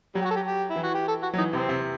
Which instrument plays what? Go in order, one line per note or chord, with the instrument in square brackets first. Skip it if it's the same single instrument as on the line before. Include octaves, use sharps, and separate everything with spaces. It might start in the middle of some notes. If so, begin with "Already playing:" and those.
[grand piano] F#3 [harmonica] G3
[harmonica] G4
F#4
A4
G4
G4
E4
[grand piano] E3
[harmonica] F#4
G4
A4
F#4
[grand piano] F#3
[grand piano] E3 [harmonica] D#4
[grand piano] C3 [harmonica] C4
[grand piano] C3